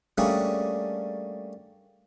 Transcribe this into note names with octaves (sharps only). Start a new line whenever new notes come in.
G3 A3 A#3 C#4 D4 G#4